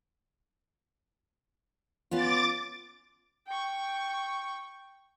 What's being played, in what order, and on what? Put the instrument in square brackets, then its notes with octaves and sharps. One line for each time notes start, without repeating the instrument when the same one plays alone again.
[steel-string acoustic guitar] B3 C#4 F4 [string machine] D6 A6
[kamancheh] G5 C#6